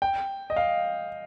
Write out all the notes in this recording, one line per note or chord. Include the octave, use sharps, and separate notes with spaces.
G5
D#5
F5